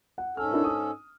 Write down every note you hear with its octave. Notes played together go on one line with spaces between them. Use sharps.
F#5
G#2 C#4 A4 F6
D4 E4 A#4
D#6